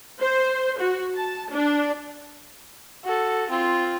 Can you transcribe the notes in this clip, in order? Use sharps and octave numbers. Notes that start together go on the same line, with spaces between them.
C5
F#4
A5
D4
F#4 A4
C4 F4